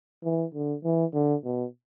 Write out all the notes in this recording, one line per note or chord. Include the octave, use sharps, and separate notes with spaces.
E3
D3
E3
D3
B2